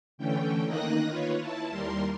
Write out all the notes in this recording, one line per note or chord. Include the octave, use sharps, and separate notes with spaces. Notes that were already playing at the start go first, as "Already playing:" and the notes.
D3 E3 A3 C#4 G5
D#3 A#3 D#4 D#6 F#6 A#6
F4 B4 C#5
E4 A5
D#2 G3 A#4 C6